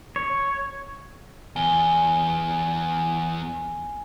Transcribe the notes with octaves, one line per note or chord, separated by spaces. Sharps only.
C#5
E2 G#5 G7